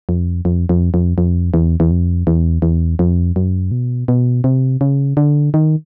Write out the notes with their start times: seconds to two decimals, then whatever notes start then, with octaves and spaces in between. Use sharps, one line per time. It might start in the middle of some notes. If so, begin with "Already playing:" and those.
0.09 F2
0.45 F2
0.69 F2
0.94 F2
1.18 F2
1.54 E2
1.80 E2
1.91 F2
2.27 E2
2.62 E2
2.99 F2
3.36 F#2
3.71 B2
4.08 B2
4.44 C3
4.81 C#3
5.17 D3
5.54 D#3